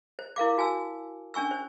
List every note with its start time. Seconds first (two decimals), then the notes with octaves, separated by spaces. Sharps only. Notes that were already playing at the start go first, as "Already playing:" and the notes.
0.19 C5
0.36 E4 A#4 F5 D6
0.58 F#4 G#5 A5 E6
1.34 C#4 D4 G#5 C#6 E6
1.51 C5